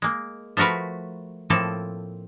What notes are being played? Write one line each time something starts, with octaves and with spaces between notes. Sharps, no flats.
G#3 A#3
F3 A3 F#4 A#4 B4
A2 F3 A#3 C4 A4 A5